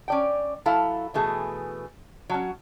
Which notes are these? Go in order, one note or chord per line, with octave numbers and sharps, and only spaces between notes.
C#4 D5 G5
F#3 E4 A4 F5
B2 E3 A3 G#4
F#3 C#4